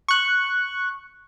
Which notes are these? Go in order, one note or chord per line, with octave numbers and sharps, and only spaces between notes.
C#6 F#6